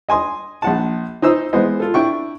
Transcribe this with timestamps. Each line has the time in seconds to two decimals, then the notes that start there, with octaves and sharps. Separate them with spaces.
0.09 D#5 G#5 C6 D#6
0.62 A#1 F#5 A5
1.22 D#4 C5 D#6 E6
1.53 E3 G#3 B3 C5 D#5
1.80 F4 A4
1.94 D4 E4 G5 C#6